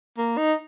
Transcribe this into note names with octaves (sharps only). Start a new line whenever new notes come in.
A#3
D#4